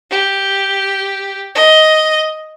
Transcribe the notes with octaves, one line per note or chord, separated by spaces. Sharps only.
G4
D#5